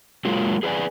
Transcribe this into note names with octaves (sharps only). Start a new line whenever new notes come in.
F#3 G#3 A#3 F4
G#4 B4 C5 D5 G#5